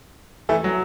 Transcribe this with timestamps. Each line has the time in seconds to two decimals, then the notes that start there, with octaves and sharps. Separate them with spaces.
0.49 E3 A3
0.64 F#3